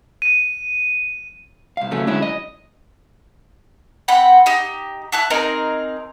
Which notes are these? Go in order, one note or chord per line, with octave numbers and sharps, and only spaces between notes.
D#7
C2 F5
C#3 F#3 A3 C#4
D3 F#3 G#3 C#4 E4
D#5
C4 F#5 G5 B5
D#4 G4
E4 A5 F#6
C4 D#4 G#4 A#4